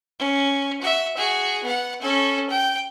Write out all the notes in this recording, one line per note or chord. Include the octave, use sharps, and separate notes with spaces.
C#4
F#4 E5
F#4 G#4
B3 F#5
C#4 A4
G5